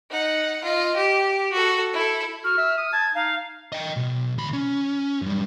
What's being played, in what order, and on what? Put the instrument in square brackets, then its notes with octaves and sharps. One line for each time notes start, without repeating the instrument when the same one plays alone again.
[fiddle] D#4 F#5
F4 D#5
G4
F#4 A4
E4 A4
[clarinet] F#4 [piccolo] F6
[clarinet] E5
D#6
[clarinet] A5 [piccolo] G#6
[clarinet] D#4 [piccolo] F5
[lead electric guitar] D#5 G5
B1
D2 B5
C#4
F#2 G3